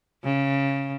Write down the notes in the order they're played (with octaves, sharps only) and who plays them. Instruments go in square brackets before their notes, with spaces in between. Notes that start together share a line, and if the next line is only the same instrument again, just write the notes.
[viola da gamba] C#3